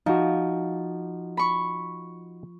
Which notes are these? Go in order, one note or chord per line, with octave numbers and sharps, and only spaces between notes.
F3 D#4 F#4
B5 C#6